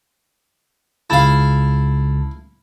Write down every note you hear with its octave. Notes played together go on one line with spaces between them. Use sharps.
C#2 C#3 E4 F5 A5